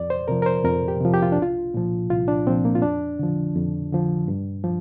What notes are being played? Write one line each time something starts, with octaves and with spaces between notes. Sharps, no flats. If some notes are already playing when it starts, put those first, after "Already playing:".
Already playing: F2 D5
C5
C3 F3 A#4
A#4
C5
F2 A#4
G4
C3 F3
G4
F4
C2 D4
F4
A#2 F3
C2 F4
D4
A#2 F3 C4
A#3
F4
F2 D4
D3 F3
F2
D3 F3
G2
F3